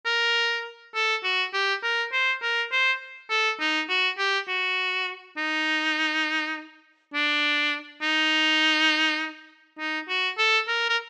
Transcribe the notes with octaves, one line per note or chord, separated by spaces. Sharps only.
A#4
A4
F#4
G4
A#4
C5
A#4
C5
A4
D#4
F#4
G4
F#4
D#4
D4
D#4
D#4
F#4
A4
A#4
A#4